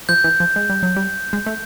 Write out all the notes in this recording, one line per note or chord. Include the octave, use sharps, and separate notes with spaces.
F3 G6
E3
F3
G#3
G3
F#3
G3
G#3
A3